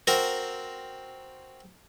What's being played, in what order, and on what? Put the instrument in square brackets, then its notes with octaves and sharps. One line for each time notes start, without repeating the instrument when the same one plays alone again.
[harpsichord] C4 F#4 A#4 A#5